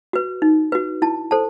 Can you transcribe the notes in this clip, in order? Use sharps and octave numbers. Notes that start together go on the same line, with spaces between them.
F#4 B4
D#4
F#4 B4
E4 A5
A4 C5 A5